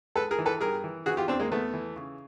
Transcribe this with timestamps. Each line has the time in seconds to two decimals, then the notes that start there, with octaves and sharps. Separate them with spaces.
0.15 G#3 A4 B4
0.31 G#4 A#4
0.39 E3
0.46 A4 B4
0.60 G2 G#4 A#4
0.84 E3
1.06 E3 F#4 G#4
1.17 F4 G4
1.28 E2 C4 D4
1.39 G#3 A#3
1.51 E2 A3 B3
1.73 E3
1.96 C#3